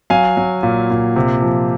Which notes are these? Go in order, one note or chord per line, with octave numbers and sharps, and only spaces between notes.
F#3 F5 G#5
F#3
A#2
A#2
C3
F3